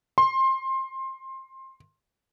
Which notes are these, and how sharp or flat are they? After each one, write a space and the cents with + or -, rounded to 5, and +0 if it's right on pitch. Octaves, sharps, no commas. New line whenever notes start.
C6 +20